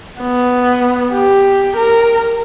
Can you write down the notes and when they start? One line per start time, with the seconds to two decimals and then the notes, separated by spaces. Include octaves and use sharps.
0.21 B3
1.12 G4
1.77 A#4